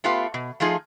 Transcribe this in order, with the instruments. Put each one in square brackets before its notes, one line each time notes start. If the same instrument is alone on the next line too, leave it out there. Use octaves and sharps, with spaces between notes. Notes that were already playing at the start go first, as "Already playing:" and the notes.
[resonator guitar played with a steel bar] A3 B3 F4 G4 B4 F5
B2
F3 A3 D#4 F4 G#4